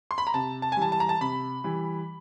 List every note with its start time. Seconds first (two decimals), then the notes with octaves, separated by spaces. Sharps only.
0.11 C6
0.18 B5
0.27 A#5
0.34 C3 A5
0.62 A5
0.72 G#5
0.77 E3 G3 A5
0.92 A5
1.00 A#5
1.09 A5
1.21 C3 B5
1.64 E3 G3